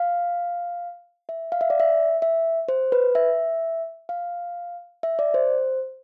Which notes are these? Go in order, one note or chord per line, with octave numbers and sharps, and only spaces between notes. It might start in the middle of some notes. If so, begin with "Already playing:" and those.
Already playing: F5
E5
F5
E5
D5
E5
E5
C5
B4
E5
F5
E5
D5
C5